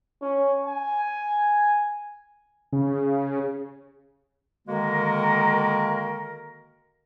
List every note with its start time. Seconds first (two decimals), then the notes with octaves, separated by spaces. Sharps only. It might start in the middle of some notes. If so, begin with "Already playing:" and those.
0.22 C#4
0.66 G#5
2.72 C#3
4.68 D3 D#3 G#3 A#3 F#4 A#4